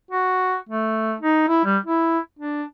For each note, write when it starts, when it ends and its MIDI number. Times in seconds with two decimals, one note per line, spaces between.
0.11 0.56 66
0.69 1.15 57
1.20 1.47 63
1.48 1.63 64
1.65 1.78 55
1.85 2.19 64
2.39 2.63 62